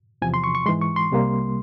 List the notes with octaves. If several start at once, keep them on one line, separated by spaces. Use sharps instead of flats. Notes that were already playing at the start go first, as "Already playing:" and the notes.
E2 C3 F3 G#5
C6
C#6
C#6
G#2 E3 G#3 C6
C#6
C6
C2 C3 G3 A#3